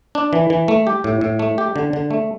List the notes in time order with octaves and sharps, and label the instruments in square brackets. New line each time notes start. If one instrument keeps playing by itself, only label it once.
[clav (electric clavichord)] D4
E3
E3
A3
G4
A2
A2
A3
G4
D3
D3
A3